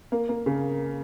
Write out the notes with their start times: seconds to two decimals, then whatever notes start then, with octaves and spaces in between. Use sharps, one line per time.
0.12 A#3
0.29 A#3
0.46 C#3